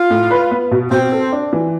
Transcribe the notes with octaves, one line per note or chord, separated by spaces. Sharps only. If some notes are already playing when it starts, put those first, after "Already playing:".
Already playing: F4
A2
B4
B3
B2
B2 C4
A4
D4
E3